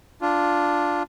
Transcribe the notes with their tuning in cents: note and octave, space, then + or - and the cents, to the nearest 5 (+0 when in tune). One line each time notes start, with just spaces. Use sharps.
D4 +0 F4 +0